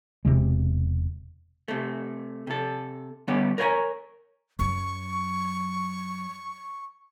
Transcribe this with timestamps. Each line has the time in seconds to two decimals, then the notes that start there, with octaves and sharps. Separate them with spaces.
0.25 E1 D#2 C3 G#3
1.68 C3 A3
2.47 C3 A4
3.28 D3 G3 B3 C#4 G4
3.58 A#4 B4 C#5 F5 G#5 A#5
4.59 F#2 F#3 C#6